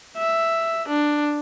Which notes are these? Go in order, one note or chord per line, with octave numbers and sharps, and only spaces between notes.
E5
D4